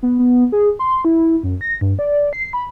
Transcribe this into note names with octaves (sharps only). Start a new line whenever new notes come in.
B3
B3
G#4
C6
E4
F#2
A#6
G2
D5
C7
B5